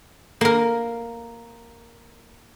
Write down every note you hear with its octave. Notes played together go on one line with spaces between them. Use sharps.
A#3 A#4